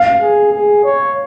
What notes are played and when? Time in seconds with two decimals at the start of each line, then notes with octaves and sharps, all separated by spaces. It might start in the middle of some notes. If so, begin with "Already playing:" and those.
Already playing: F5
0.21 G#4
0.53 G#4
0.84 C#5